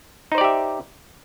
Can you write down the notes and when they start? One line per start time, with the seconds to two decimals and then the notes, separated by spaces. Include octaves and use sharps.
0.32 D#4
0.35 C5
0.38 D5
0.41 G4
0.44 E5